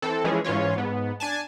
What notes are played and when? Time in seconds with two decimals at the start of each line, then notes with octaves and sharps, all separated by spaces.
0.02 E3 C4 A4
0.24 E3 F3 G#3 C#4 G#4
0.44 G#2 E3 C#4 F4 C#5
0.76 G#2 B3
1.20 D4 G#5 A5